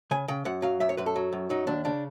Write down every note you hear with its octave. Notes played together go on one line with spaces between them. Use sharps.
C#3 G#5
C#3 G5
F#2 F#5
F#3 F5
F#2 E5
C#5
F#2 B4
A4
F#3
F#2
F#3 D#4
D#2 D4
C#3 D4